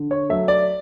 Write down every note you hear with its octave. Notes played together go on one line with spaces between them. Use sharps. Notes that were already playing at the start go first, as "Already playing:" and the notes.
Already playing: D3
C#5
F#3 A3 E5
D5